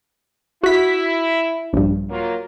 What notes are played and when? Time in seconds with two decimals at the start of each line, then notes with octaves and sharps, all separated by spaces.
0.63 E4 F#4 B6
1.73 A#1 G2
2.09 F#3 A#3 F4